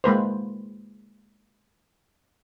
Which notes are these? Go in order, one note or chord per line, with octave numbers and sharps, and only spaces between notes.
G#3 A#3 B4 C5